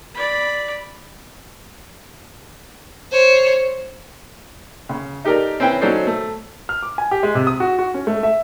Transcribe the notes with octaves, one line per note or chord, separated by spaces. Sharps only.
D5 B5
C5 C#5
C#3
D#4 G4 A4 A#4 D5
C4 C#4 E4 B4 G5
F#3 C#4 D#4 A4 C5 D5
A3
F6
D6
G#5
G4
G#3
C3
D#6
F#4
F#4
C#4
A3
E5